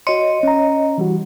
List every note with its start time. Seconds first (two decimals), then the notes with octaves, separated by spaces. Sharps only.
0.07 F#4 C#5 D#5 C6
0.43 C#4 A#5
0.98 E3 G3 F#4